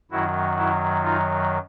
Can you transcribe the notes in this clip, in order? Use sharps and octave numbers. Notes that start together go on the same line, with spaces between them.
F#2 D#3 F#3 E4 F#4
E4 F#4
D#4 F4